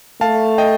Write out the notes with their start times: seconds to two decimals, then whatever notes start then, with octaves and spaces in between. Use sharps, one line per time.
0.21 A3 F5 A5
0.58 D#5 G5